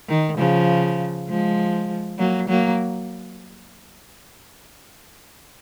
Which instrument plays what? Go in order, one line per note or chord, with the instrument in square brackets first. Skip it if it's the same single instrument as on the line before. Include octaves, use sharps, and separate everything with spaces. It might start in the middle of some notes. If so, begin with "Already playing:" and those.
[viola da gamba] D#3
C#3 F3
F3 G#3
F#3 A#3
F#3 A#3